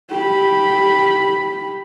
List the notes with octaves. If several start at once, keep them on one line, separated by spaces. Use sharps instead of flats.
G4 B5